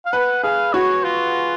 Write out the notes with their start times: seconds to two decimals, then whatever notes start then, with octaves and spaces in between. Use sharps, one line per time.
0.06 F5
0.13 B4 F#5
0.43 G#4 F5
0.73 F#4 C#5
1.04 F4